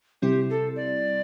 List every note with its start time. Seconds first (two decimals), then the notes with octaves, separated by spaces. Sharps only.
0.22 C3 G3 C4 E4 G4
0.50 A4
0.76 D5